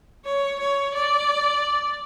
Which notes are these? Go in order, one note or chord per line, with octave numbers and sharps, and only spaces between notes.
C#5
C#5
D5